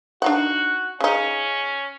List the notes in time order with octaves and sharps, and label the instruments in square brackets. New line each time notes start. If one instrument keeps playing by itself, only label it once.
[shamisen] D4 D#4 F#5 [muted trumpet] F#4
[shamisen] C#3 D#4 [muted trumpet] C#4